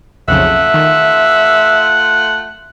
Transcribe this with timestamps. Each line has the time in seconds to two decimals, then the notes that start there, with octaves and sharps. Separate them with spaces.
0.28 B1 F2 C#3 A3 F4 E5 F#5
0.74 D#3